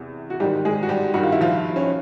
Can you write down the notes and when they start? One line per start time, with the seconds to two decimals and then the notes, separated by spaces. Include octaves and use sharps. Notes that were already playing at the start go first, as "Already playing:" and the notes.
Already playing: E2 C3 E3
0.30 F#4
0.40 G#2 D#3 G3 G4
0.65 G#3 G#4
0.83 F#4
0.89 G3 G4
1.14 G2 D#3 F#4
1.23 F4
1.32 E4
1.41 F3 F4
1.76 C#4